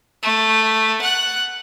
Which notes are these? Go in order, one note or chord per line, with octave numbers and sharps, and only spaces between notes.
A3
F#5 F#6